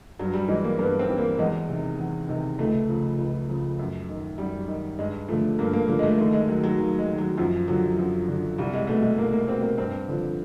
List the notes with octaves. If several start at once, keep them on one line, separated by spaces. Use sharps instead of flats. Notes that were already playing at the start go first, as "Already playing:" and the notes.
G2 F#3
G3
E3 G#3
A#3
G2 B3
C4
E3
A#3
E2 G#3
C3 D#3
E2
C3 D#3
C#2 A3
C#3 F3
C#2
C#3 F3
F#2
D#3
F#2 G3
D#3
G2 G#3
D3 F3 A3
G2 A#3
A#3
D3 F3 A#3
G#3
A3
D#2 A3
G#3
D#3 F#3
F#3
D#2
G#3
D#3
F#3
F#2 F3
D3 F3 F#3
F#2 F3
D3 F3
C2 G3
G#3
B2 A3
G#3
C2 A#3
A#3
B2 C4
A#3
G2 C4
D3 F3